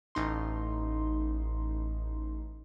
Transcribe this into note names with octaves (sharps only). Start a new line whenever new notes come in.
A1 D#4 C6